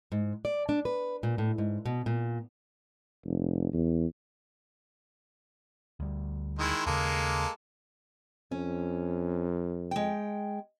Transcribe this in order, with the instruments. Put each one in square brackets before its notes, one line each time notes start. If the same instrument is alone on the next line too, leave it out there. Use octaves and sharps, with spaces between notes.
[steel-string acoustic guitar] G#2
D5
D4
B4
A#2
A2
G#2
B2
A#2
[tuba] F1
E2
[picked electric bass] D2 G3
[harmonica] D#3 G#3 E4
[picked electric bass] D#2 C#3 [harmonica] G#3 A#3 A4
[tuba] F2 [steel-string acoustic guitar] C#4
[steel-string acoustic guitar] G#3 G5